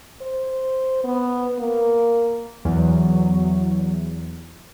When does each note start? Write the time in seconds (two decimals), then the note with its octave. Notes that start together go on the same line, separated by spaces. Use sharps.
0.21 C5
1.04 B3
1.59 A#3
2.65 E2 F#3